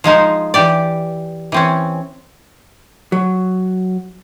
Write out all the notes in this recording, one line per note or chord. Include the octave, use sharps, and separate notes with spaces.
F3 G#3 D#4 C5
E3 G4 D5
E3 C4 C#4
F#3